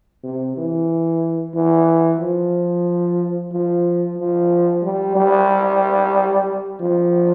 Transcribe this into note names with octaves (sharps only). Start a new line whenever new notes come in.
C3
E3
E3
F3
F3
F3
G3
G3
F3